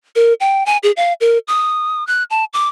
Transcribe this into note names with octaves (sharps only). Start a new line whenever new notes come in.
A#4
G5
G#5
G#4
F5
A#4
D#6
F#6
A5
D6